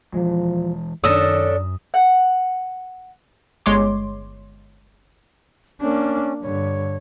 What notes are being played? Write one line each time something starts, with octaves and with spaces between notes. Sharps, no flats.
E3 F3 G#3
F#2 D#3 C#4 D4 A4 D#6 E6 A#6
F#5
G1 G#3 C#5 C6 D6
A#3 C#4 D4
G2 D3 C#5